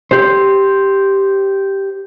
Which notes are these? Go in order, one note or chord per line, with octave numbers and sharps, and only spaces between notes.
G4 C5